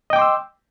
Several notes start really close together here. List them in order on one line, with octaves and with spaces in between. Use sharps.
D#5 G5 D6 C6 E6